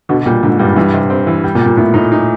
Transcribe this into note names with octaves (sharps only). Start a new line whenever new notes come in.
B2 D3
A#2 G3
G#2 D3
G2 G3
G2 E3
C3
C4
E3
G3
A#2
G3
A#2
A2 B3
A2 D#4
D#4